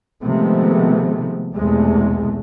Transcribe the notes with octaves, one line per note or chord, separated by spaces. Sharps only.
C3 D#3 F3 G#3 A3 B3
B1 E2 C3 G#3 A3